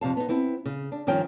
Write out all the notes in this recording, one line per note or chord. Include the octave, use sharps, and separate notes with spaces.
F2 C3 F5 A5
B3 D#4
B3 C4 E4
C#3
D4
G2 D#3 F3 C#4 G5